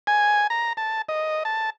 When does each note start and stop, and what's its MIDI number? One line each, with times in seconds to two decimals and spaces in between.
0.07 0.47 80
0.50 0.73 82
0.77 1.02 81
1.09 1.43 75
1.45 1.70 81